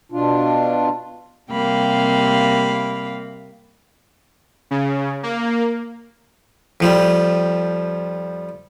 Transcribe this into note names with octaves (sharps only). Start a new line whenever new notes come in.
B2 D4 F4
C3 G3 A#3 F5 G5 B5
C#3
A#3
F2 F3 G3